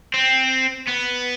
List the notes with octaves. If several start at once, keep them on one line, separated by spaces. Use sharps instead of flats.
C4
B3